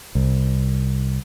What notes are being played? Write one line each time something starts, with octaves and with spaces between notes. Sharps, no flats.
C2